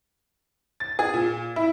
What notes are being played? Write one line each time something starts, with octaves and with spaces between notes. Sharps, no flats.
A6
G#4
A#2
E4